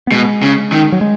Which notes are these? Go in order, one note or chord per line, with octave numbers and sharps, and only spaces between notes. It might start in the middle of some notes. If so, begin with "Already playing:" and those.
B3
B2 G#3
C#3
D#3
F#3
G#3